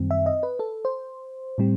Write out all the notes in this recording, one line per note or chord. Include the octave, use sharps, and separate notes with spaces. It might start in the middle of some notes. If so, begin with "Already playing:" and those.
Already playing: F#2 D#3 G3 C4
E5
D#5
B4
A4
C5
A2 G3 C4